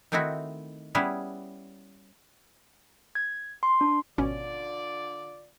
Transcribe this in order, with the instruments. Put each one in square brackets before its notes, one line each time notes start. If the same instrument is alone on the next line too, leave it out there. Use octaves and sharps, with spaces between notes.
[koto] D#3 A3 C4 D#4 E4 F#4
G3 B3 C#4 E4 G#4
[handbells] G#6
C6
D4
[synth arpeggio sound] G#1 B2 C#4 [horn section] D3 F4 D5